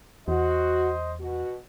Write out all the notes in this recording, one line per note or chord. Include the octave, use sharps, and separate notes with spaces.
E2 F#4 C5 D#5
B2 F#4